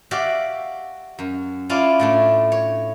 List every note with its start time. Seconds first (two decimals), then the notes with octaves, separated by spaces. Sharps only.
0.11 F#4 G4 D5 E5 F5
1.19 F#2
1.69 C#4 E4 F4 D5 F5 A5
1.99 A2 A3 D4
2.52 C#5